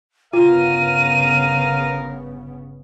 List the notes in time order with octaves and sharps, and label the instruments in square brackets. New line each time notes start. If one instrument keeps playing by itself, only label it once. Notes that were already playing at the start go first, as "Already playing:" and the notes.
[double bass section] G1 C#3 B3 [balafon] F4 [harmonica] A#4 F5 [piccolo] D#7